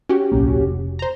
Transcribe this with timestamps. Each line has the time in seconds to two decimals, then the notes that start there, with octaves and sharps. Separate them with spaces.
0.09 C#4 F#4 G4
0.32 D1 B1 A#3
0.62 F1
0.99 C5 A#5